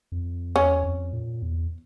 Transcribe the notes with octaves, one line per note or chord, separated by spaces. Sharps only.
F2
E2 C#4
F2
A#2
E2